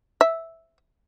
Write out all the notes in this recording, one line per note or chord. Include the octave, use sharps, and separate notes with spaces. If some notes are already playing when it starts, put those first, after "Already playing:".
E5